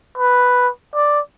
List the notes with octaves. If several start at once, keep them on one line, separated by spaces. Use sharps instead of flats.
B4
D5